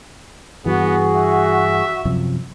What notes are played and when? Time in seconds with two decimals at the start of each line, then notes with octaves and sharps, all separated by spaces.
0.66 G2 E3 B3 F#4 G#4
1.16 E5
2.05 F#2 C3 F3